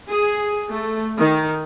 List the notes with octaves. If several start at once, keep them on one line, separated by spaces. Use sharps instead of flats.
G#4
A3
D#3